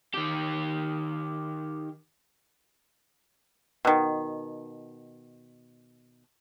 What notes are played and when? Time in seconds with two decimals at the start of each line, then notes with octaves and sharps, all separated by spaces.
0.14 D#3 G4
3.85 B2 D#3